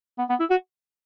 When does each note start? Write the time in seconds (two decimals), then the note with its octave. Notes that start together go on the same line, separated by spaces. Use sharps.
0.18 B3
0.29 B3
0.40 E4
0.50 F#4